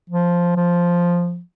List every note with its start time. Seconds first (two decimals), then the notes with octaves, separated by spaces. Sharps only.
0.10 F3
0.56 F3